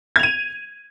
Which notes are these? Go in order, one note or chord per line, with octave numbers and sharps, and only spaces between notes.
G#6 D#7 F7